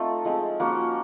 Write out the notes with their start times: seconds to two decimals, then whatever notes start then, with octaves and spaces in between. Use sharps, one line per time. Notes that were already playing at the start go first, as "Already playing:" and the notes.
Already playing: A3 C4 D#4 F4 A4
0.25 F3 G#3 C4
0.60 F3 A#3 C#4 F#4